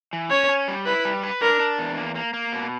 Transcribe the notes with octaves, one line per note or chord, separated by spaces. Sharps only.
E3
C#4 C#5
C#4
G3
E4 B4
G3
B4
D4 A#4
D4
E2
A#3
A#3
A#3
B2